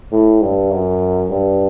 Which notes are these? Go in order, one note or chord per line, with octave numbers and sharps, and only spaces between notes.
A2
G2
F#2
G2